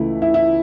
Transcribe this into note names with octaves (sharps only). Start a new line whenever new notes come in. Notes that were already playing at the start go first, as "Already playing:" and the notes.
Already playing: C#2 C#3 E3 A3 E4
E4
E4